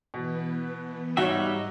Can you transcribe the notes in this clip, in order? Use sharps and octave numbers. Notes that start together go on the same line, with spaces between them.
B2 E3 B3 B4
G#2 G3 D#4 F#4 C#5 D#5 E5